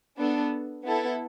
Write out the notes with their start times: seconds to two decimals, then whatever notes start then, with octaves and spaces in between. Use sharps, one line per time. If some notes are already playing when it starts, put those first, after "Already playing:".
0.18 B3 D4 A4
0.84 B3 E4 A4